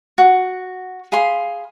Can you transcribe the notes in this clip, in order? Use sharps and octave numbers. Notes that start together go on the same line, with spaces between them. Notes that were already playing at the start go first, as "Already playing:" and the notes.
F#4
G#4 F5 B5 C6